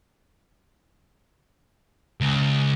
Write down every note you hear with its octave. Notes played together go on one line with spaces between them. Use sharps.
C#2